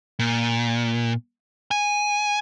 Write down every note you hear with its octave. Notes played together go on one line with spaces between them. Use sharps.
A#2
G#5